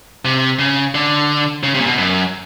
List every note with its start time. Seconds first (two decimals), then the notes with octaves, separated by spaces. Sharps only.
0.25 C3
0.59 C#3
0.95 D3
1.63 C#3
1.75 C3
1.80 A#2
1.86 B2
1.98 F#2